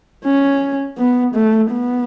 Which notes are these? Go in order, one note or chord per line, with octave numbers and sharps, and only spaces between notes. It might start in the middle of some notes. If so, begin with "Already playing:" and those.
C#4
B3
A3
B3